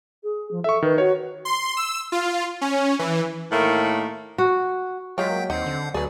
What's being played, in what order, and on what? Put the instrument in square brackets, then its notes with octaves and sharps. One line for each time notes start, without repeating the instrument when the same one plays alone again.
[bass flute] G#4
F3
[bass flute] A4 [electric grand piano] E5 C#6
[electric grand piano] D#3 [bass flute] B4
[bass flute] F#4 [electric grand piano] C#5
[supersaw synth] C6
E6
F4
C#4
E3
[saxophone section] A2 D#3 A3 A#3
[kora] F#4
[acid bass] F#3 [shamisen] G#3 C#5 [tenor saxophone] F4 [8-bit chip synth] G5 G6 B6
[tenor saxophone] A#3
[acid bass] D#2 [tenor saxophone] C4 [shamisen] D#4 [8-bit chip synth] F#5 G6 C7
[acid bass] D3
[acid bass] D2 [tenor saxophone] F#3 [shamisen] G#4 B4 [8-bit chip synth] D5